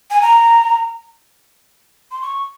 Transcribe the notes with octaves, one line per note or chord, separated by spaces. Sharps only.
G#5
A#5
C6
C#6